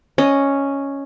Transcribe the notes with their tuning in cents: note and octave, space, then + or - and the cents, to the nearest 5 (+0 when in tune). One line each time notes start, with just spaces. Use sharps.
C#4 +0 D#5 +0